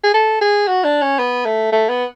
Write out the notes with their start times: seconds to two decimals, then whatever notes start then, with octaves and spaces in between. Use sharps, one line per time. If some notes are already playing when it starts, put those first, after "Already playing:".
0.04 G#4
0.14 A4
0.41 G#4
0.68 F#4
0.84 D4
1.02 C#4
1.19 B3
1.46 A3
1.72 A3
1.89 B3